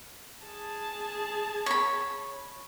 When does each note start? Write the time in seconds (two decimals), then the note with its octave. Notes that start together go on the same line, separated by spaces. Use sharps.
0.44 G#4 A5
1.66 C#5 B5